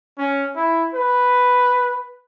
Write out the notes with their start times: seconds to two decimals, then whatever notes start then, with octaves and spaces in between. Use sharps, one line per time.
0.18 C#4
0.56 E4
0.94 B4